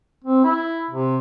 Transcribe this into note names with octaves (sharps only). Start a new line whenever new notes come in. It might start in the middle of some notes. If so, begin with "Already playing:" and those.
C4
E4
C3